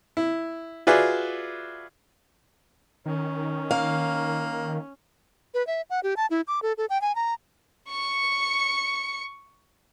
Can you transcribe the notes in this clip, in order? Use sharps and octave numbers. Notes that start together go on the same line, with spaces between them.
E4
F4 F#4 G#4 B4 D5 E5
D#3 C#4
A#3 F5
B4
E5
F#5
G4
A5
E4
D6
A4
A4
G5
G#5
A#5
C#6 C#7